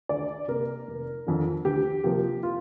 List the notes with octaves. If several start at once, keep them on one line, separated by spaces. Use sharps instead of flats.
D2 D5
C3 A#3 A#4
F1
F2 D3
D2 G4
C3 F3 A#3 G4
F4